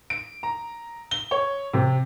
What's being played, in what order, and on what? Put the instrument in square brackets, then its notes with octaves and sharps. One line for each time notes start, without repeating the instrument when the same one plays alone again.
[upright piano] D7
A#5
G7
C#5
C3